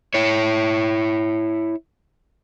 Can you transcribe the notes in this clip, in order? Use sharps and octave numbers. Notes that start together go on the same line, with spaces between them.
E4 C#5